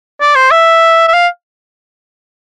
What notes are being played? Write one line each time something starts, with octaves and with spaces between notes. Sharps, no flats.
D5
C5
E5
E5
F5